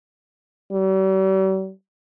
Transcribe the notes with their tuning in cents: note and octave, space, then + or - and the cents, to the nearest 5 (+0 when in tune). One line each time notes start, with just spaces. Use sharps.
G3 -45